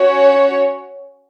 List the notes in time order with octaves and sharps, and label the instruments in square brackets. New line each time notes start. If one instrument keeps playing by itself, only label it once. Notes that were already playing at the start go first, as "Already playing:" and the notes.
Already playing: [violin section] C#4 F#4 C#5